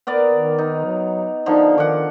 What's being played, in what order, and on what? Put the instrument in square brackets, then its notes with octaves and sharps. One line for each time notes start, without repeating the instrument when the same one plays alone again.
[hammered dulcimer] B3 A#4 D5
[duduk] D#3
[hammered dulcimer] D#4
[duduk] F#3
[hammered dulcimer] D3 F3 [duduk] D#4
[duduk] D#3 [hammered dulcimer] F#5 D6